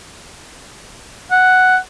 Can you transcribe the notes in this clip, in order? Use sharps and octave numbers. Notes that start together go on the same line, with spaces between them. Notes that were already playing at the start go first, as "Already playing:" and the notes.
F#5